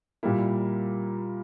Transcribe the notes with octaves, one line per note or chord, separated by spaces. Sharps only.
A#2 G3 A#3 E4